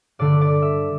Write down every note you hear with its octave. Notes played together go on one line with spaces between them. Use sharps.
G2 D3 A3 D5
D5
E5